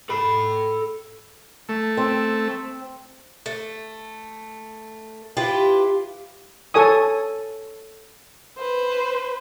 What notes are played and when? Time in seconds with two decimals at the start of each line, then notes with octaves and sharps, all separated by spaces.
0.09 A4 B5
1.69 A3
1.97 C4
3.46 A3
5.37 E4 F4 G4 B4
6.74 A4 C#5 G#5 D#6
8.57 B4 C5